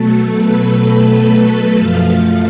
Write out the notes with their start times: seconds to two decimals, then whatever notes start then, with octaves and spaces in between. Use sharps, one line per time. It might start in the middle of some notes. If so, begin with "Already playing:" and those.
Already playing: B2 F#3 A3 A4
0.35 B4
0.82 A4
1.75 F#2 F3 A3 F5